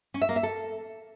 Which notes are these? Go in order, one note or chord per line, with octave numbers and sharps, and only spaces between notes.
C#4
E5
A#3
E5
A4